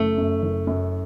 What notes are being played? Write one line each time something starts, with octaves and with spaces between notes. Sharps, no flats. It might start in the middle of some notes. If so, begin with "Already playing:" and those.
Already playing: F#1 A3
F#2
F#1
F#2